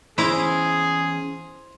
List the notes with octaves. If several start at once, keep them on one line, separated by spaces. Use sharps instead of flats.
E3 B3 C#4 E4 G#4 C5 A#5 D6